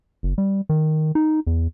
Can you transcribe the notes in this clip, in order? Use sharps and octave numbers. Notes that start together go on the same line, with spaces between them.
F#1
G3
D#3
D#4
E2